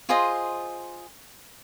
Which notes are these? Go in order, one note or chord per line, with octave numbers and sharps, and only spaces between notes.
F4 G#4 C5 D#5